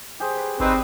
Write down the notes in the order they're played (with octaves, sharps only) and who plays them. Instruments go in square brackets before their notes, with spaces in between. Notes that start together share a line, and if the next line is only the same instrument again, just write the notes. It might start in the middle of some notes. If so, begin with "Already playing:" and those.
[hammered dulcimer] G4 G#4 C5
B4
[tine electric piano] G#1 [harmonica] C4 [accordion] D#4 B4 C5 [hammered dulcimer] D5 D#5 G5